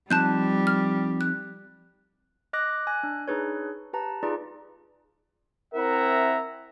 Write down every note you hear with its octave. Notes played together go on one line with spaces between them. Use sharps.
F3 G3 C4 D#4 A5 F#6 G6
F6
F#6
D#5 D6 F#6 A#6
G#5 F#6
D4
D4 D#4 G#4 B4 C#5
G4 B4 A5 A#5
D#4 F4 G#4 B4 D5
C4 E4 A#4 E5 F#5 A#5